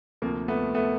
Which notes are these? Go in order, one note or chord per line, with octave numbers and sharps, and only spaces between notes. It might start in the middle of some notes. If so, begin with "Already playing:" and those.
D2 C3 F3 A#3
A3 B3
A3 B3